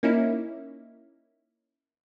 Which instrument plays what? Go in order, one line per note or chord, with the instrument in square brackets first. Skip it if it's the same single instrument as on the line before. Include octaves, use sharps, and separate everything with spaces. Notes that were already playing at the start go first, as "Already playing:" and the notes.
[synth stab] A#3 C#4 D#4 E4